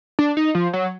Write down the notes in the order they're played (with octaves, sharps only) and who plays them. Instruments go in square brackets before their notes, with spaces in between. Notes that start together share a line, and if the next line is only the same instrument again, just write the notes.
[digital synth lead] D4
D#4
F3
F#3